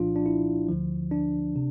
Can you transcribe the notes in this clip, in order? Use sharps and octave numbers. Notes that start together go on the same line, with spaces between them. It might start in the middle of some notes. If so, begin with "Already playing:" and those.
Already playing: C2 A#2 F3 D4 F4
D4
E4
D2 D3 F3
D4
C3